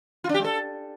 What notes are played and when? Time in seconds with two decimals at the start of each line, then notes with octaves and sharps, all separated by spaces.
0.24 F4
0.29 D4
0.34 G4
0.39 G#3
0.44 A4